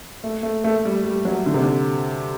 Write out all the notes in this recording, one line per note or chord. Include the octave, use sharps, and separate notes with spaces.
A3
A3
A3
A3
G3
G3
F#3
D3
C3
D3